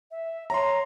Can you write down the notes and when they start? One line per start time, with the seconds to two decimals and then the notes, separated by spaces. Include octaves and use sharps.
0.11 E5
0.50 C#5 A#5 C6